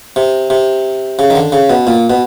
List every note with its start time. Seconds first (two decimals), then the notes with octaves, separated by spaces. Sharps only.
0.16 C3
0.50 C3
1.19 C#3
1.30 D#3
1.35 D3
1.52 C#3
1.70 B2
1.87 A#2
2.10 B2